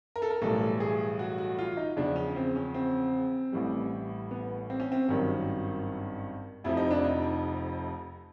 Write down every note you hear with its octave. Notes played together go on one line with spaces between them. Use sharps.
A#4
A4
A#4
B1 A2 E3 G3 A4
G#4
F#4
F#4
F4
D#4
E2 C#3 F3 D4
C#4
C4
C#4
C4
A1 A2 E3 G3
B3
C4
C#4
C4
G#1 G2 D#3 F#3 C#4
F1 F2 C3 F3 E4
D#4
D4
D#4